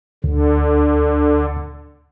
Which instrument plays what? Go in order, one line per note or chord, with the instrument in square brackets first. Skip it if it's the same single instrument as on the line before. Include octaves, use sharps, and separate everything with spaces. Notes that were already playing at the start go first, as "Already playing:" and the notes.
[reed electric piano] D2 [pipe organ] D3